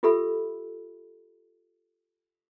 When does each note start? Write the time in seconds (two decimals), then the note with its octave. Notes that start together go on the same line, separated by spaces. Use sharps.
0.03 F4 G4 A4 E5 B5 E6